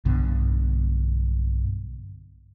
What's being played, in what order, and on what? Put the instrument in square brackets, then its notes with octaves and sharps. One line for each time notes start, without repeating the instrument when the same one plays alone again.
[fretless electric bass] B1 G2 B2 D3